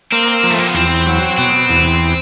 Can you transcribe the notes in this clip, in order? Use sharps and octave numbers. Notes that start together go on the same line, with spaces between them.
A#3 C4
F3
A3
A#3
B3
E2 C4
F#3
B2 C4
E2